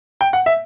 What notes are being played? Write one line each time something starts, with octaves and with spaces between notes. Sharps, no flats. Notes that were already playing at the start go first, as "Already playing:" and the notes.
G5
F#5
E5